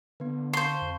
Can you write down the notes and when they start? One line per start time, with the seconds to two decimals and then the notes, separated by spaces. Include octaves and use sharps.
0.20 D3 B3 B4
0.53 C5 F5 A5 C6 C#6
0.82 F2